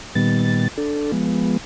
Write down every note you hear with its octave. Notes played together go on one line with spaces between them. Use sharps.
A#2 D#3 G3 B3 A6
D4 A4
F3 G#3 B3